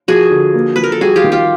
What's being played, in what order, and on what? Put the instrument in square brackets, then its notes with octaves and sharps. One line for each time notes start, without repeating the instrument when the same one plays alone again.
[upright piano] F3 [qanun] F#4 G#4
[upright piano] D3
A#3
[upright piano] F3 [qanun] B4
[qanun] A#4
A4
[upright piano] G3 [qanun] F#4 G#4
[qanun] F4 G4
[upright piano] D#3
[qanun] F4 G4